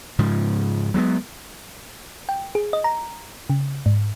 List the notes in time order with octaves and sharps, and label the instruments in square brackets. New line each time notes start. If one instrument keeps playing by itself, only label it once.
[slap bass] G#2 C#3 F3
F#3 G#3 A3 B3
[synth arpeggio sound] G5
G#4
D#5
A#5
C#3
G#2